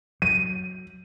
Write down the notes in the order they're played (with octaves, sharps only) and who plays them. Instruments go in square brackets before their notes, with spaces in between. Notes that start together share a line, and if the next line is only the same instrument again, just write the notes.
[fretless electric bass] F#3 [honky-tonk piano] D#7